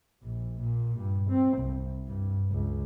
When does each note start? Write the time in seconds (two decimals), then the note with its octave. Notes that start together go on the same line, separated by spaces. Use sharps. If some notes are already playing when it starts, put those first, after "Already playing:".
0.24 A#1
0.63 A#2
1.00 G2
1.30 C4
1.58 C2
2.08 G2
2.51 C#2